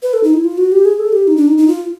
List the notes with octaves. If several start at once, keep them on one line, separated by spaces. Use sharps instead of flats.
B4
A4
D#4
E4
F4
F#4
G4
G#4
A4
G4
D#4
D4
D#4
D#4
F4